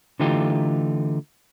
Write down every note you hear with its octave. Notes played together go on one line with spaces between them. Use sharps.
D3 E3 A3 D#4 F4 G4